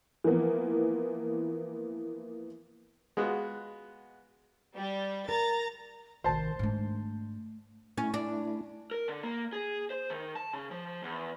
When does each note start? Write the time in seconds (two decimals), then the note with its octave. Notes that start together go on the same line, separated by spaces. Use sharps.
0.24 E3 F3 A#3 B3
3.17 G#3 B3 F4 F#4
4.75 G3
5.29 A#4 A#5 A6
6.24 A1 C3 D#3 C5 A5
6.59 G#2 A3 D4
7.97 A3 C#4 E4
8.14 D4
8.91 A#4
9.08 D3
9.23 A#3
9.53 G#4
9.90 C5
10.10 D#3
10.35 A5
10.53 C#3
10.71 F3
11.03 E2